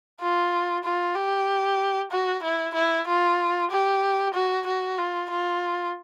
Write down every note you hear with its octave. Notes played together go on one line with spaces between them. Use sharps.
F4
F4
G4
F#4
E4
E4
F4
G4
F#4
F#4
F4
F4